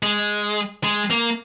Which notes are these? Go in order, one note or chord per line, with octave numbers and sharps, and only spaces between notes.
G#3
G#3
A#3